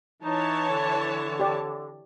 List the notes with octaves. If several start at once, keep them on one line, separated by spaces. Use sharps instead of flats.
E3 D#4 C#5 A5
D3
G4 D5